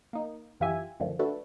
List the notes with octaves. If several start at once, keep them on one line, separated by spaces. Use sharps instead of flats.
A#3 D#4
F#2 E3 F4 G4 E5 G#5
F#2 A2 D3 D#3 F3
A3 D4 F#4 A4 B4